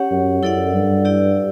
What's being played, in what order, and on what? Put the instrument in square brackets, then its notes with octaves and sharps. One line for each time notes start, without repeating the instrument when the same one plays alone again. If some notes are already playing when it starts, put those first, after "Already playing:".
Already playing: [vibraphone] C#4 G4 C#5 F#5
[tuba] F#2
[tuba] F#2 [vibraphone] E4 A4 D5 F#5
[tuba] G2
[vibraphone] E4 G4 D5